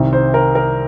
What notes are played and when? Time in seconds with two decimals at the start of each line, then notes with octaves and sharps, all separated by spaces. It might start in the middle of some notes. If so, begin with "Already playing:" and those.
Already playing: C2 C3 D#3 C5
0.13 C5
0.34 A#4
0.55 A#4